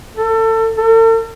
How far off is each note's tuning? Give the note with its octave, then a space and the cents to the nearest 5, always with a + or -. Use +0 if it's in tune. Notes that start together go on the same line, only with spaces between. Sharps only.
A4 +30
A4 +45